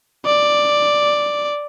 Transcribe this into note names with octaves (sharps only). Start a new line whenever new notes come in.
D5